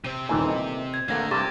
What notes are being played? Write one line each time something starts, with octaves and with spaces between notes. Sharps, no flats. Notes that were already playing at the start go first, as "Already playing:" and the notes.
C3 C4 D#7
D#1 A#2 E3 A3 D#4 G#5
D#5
G#6
A1 D3 A3 A#3 F#5 G#6 A#6
C2 G2 C3 G4 C#6 D6 A6